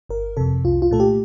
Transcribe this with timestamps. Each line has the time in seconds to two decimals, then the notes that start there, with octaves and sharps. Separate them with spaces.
0.09 G1 A#4
0.37 F2 C3 A4
0.64 C2 F4
0.82 F4
0.91 A#2 A3 A4
1.00 G4